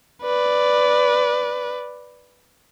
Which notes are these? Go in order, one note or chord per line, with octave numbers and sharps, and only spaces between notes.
B4 D5